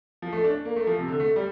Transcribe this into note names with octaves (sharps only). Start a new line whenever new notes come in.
F3
A3
D4
A#3
A3
F3
C3
D3
A3
G3